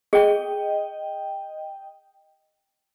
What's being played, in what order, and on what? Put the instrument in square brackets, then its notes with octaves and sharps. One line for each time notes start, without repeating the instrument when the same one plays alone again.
[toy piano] G#4 [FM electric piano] D#5 G5